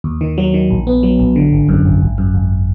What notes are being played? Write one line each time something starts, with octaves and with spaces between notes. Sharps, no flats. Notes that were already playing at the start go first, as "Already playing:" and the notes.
D#2
D#3
F#3
D#3
A#1
B3
F#3
A#1
D3
G#1
F#2
G#1
G#1
F#2
G#1